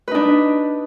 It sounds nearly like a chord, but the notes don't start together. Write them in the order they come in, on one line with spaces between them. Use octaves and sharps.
B4 D#4 D4